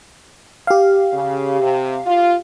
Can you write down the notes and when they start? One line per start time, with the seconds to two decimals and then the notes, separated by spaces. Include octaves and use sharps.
0.67 G4 F5
1.13 C#3
1.61 C3
2.06 F4